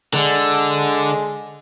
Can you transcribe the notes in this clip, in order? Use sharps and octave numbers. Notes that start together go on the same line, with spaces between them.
D3 G#3